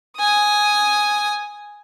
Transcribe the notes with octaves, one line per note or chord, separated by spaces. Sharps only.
G#5 D#6